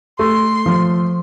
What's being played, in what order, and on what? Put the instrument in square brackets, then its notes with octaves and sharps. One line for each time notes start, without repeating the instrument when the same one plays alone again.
[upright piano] A3 [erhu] C6
[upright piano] F3